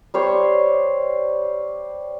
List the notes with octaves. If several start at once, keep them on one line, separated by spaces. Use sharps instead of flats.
G3 C5 C#5